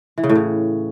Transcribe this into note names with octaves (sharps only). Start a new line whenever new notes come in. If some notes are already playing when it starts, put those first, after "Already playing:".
E3
C#3
A2
C#3